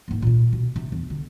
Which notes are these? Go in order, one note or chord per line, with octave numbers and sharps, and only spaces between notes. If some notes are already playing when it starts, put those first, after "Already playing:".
G#2 A#3
A#2 F4
B2
C3
E2
D3